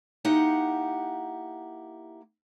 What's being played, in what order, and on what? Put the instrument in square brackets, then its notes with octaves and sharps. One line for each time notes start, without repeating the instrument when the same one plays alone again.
[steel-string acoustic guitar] A#3 D#4 E4 G4 F#5